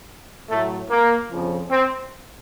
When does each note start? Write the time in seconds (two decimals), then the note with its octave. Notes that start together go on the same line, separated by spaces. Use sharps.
0.50 A2 F#3 A3
0.90 A#3
1.30 F2 C#3 F3
1.71 C4